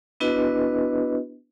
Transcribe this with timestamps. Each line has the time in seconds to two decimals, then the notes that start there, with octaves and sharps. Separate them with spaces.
0.20 B3 D4 E4 F#4 B4 D#5